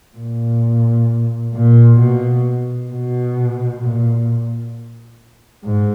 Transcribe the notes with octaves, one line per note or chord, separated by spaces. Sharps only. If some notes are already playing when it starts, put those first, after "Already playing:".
A#2
A#2
B2
B2
A#2
G#2